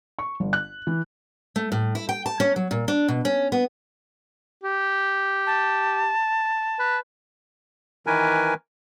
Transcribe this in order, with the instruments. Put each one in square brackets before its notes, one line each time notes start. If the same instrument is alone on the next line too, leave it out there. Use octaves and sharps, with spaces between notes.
[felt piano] C#6
G1
F#6
E3
[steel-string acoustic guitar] A3
A2
E4
G5
A5
C#4
F#3
A#2
D4
B2
C#4
B3
[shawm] G4
[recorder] A5
[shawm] B4
[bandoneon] D#3 E3 A#4 B4 G#5